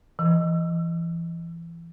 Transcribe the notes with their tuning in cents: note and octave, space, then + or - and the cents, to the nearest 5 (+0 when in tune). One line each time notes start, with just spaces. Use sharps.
E3 +30